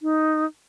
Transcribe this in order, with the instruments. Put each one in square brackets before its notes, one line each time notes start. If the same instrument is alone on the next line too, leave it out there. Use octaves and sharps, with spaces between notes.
[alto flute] D#4